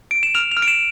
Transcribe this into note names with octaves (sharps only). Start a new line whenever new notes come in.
D7
E7
F6 F7
F7
F6
D7
E7